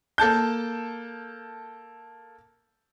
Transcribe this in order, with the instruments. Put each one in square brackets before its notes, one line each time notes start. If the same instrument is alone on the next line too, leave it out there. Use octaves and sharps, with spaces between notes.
[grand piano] A#3 A4 A5 G6